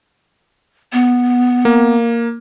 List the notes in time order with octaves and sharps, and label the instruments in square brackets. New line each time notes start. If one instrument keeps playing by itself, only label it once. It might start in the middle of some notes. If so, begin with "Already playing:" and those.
[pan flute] B3
[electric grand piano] A#3